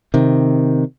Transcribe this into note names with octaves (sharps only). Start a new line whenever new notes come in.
C3 D#3